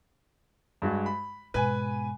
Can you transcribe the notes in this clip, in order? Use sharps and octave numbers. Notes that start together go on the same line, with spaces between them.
G2 G#3 F#4
B5
G#2 B2 B4 G#5